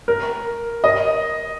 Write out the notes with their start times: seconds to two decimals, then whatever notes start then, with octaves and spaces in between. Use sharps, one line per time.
0.08 A#4
0.84 D#5